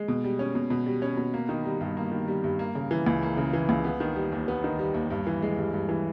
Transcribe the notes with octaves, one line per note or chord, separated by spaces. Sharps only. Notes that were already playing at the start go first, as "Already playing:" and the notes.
Already playing: G#3
B2
G3
C#4
B2
B2
G3
C#4
B2
A#3
D#3
G3
G2
A#3
D#3
G3
G2
A#3
C#3
E3
C#2
A#3
C#3
E3
C#2
B3
D#3
G3
D#2
B3
D#3
G3
D#2
G2
E3
G#3
G2
G2
E3